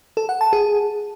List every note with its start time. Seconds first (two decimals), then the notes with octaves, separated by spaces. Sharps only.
0.17 A4
0.29 F#5
0.41 A5
0.53 G#4